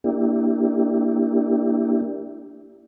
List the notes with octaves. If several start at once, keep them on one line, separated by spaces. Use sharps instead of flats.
A#3 D4 E4 G4